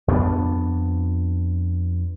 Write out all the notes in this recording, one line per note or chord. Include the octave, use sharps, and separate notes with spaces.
F2 B3 C4 D4